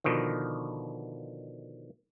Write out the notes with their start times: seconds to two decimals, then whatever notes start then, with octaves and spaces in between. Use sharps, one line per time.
0.04 B2 D3 D#3 F3